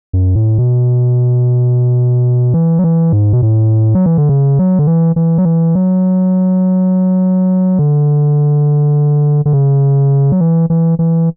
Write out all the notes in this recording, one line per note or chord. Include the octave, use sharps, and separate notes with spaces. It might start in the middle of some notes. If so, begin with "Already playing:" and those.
F#2
A2
B2
E3
F#3
E3
G#2
B2
A2
F#3
E3
D3
C#3
F#3
D3
E3
E3
F#3
E3
F#3
D3
D3
C#3
F#3
E3
E3
E3